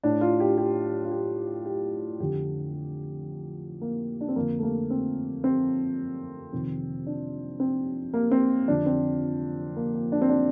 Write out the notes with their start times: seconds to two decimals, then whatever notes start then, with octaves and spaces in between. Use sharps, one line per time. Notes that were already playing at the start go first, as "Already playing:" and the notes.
0.04 A2 D4
0.21 F4
0.40 G4
0.58 G4
1.05 F4
1.12 G4
1.65 G4
2.19 F2 D3 G4
3.81 A#3
4.21 D4
4.29 C4
4.35 F2 D3 A#3
4.59 A3
4.63 A#3
4.90 C4
5.44 C4
6.52 F2 C3 D#3
7.06 D4
7.60 C4
8.14 A#3
8.31 C4
8.68 F2 D3 D4
8.86 C4
9.76 A#3
9.94 A#3
10.12 D4
10.22 C4
10.29 D4